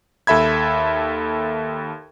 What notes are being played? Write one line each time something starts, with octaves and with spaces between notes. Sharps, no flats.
D#2 A4 E5 B5 G#6